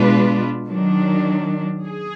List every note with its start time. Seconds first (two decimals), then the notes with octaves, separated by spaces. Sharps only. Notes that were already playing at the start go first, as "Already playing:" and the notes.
Already playing: B2 G#3 D4 F4 B4
0.65 D#3 F#3 D4
1.85 G#4